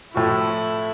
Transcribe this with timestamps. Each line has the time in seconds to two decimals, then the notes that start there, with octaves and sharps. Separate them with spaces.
0.14 A2 F3 E4 F#4 A4